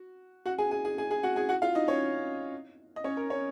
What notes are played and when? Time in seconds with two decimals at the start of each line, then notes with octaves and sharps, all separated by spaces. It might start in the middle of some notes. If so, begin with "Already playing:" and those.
Already playing: F#4
0.46 F#4 F#5
0.58 G#4 G#5
0.71 G#4 G#5
0.85 G#4 G#5
0.98 G#4 G#5
1.11 G#4 G#5
1.23 F#4 F#5
1.36 G#4 G#5
1.49 F#4 F#5
1.62 F4 F5
1.75 D#4 D#5
1.88 C#4 C#5
2.96 D#5
3.04 C#4 C#5
3.17 A#4
3.30 C#4 C#5